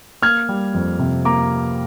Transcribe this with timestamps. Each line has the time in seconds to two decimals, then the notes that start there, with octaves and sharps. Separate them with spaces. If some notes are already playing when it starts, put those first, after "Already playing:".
0.22 A#3 F6 G#6
0.49 G3
0.74 F2
0.99 C3
1.25 A#3 A#5 D6